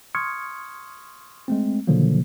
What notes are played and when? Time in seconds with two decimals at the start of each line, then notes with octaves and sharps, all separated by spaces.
0.15 C6 C#6 D#6 F6 G#6 C#7
1.48 G#3 A3 C4
1.87 B2 D3 D#3 F3 F#3 A#3